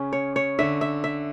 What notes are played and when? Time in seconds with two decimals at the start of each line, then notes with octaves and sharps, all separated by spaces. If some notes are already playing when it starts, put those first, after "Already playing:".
Already playing: C#3 C#4
0.13 C#5
0.36 C#5
0.59 D3 E5
0.81 E5
1.04 E5